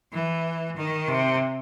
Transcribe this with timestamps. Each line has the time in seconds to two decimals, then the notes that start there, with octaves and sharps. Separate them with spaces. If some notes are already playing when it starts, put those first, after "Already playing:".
0.13 E3
0.76 D#3
1.08 C3